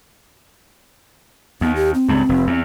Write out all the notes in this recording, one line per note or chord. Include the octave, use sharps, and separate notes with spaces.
D#2 B3
G4
C4
C#2 G2
F1
E2